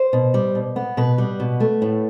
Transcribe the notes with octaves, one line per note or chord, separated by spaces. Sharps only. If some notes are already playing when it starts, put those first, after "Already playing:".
Already playing: C5
B2
G3
B2
B3
B2 B4
G3
B2
A3
A2